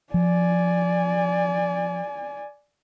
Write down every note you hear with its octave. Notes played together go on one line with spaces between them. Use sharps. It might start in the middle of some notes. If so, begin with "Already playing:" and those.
F3 D5 G#5